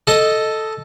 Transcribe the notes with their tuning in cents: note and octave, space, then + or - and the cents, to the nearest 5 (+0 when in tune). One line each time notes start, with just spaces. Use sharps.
A4 +0 D#5 +0